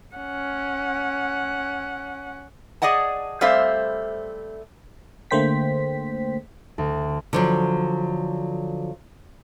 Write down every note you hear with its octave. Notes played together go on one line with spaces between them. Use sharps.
C#4 F#5
G#4 D5 D#5 F#5 A5
G3 A3 C4 C5 E5 F5
D3 A3 A#3 C5 G5 B6
D2
D3 F3 F#3